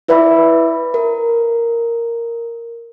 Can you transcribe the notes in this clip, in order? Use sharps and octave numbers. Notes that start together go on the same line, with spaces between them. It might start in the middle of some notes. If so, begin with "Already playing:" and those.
E4 B4 D5 E5 B5
A#4